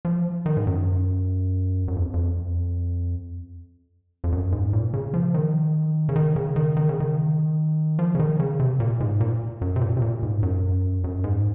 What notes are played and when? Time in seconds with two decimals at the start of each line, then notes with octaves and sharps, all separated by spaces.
0.05 F3
0.46 D#3
0.57 G#2
0.67 F#2
1.88 F#2
1.97 F2
2.14 F2
4.24 F2
4.32 F#2
4.52 G#2
4.73 A#2
4.94 C#3
5.14 F3
5.34 D#3
6.09 C#3
6.16 D#3
6.36 C#3
6.56 D#3
6.77 D#3
6.89 C#3
7.00 D#3
7.99 F3
8.15 C#3
8.20 D#3
8.40 C#3
8.60 C3
8.80 A#2
9.00 G#2
9.21 A#2
9.61 F#2
9.76 C3
9.81 A#2
9.97 C3
10.02 A#2
10.23 G#2
10.43 F#2
11.04 F#2
11.24 G#2